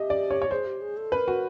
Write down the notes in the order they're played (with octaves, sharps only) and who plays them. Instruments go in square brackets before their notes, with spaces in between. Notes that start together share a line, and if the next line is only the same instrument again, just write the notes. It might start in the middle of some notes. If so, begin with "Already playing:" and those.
Already playing: [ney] G4 [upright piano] D#5 E5
[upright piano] D5
C#5
C#5
[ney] G#4 [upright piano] C5
[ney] G4
G#4
A4
[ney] A#4 [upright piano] B4
[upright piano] F#4